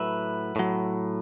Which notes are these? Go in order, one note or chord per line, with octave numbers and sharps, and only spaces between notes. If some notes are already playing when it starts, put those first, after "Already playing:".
Already playing: A2 F#3 B4 E5
A2 F#3